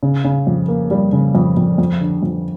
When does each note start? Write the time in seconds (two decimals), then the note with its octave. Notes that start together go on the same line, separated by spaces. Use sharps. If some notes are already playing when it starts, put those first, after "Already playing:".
0.03 C#3
0.24 C#3
0.47 F2
0.68 A#3
0.91 G3
1.13 C#3
1.35 F2
1.57 F2
1.78 F2
2.01 D3
2.23 F2